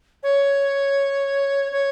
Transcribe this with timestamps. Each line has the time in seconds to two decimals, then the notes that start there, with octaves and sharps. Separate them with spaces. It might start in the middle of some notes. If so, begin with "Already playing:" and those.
0.23 C#5
1.72 C#5